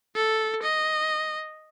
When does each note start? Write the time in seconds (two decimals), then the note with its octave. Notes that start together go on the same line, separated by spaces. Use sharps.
0.15 A4
0.63 D#5